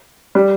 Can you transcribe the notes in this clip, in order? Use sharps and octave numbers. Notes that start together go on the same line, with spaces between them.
G3